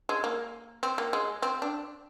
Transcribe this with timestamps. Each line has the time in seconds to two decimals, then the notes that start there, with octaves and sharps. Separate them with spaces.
0.09 G#3
0.24 A#3
0.83 C4
0.98 A#3
1.13 G#3
1.42 C4
1.62 D4